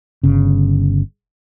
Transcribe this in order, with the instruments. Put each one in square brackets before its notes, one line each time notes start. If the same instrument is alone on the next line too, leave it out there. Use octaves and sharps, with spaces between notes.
[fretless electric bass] G1 C#3